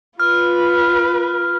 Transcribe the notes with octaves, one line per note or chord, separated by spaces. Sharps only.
F4 B4 F6